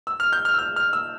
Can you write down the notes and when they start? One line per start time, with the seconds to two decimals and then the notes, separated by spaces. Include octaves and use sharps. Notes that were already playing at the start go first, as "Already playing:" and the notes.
0.07 E6
0.20 F6
0.33 G6
0.45 F6
0.54 E6
0.59 F6
0.76 F6
0.93 E6